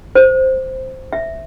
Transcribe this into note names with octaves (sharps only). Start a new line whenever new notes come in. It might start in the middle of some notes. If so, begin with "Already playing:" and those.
C5
E5